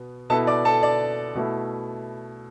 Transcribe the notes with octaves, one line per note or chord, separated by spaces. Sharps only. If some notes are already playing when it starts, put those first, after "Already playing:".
Already playing: B2 B3
B2 B3 E4 A4 A5
D5 D6
A4 A5
D5
B2 A3 E4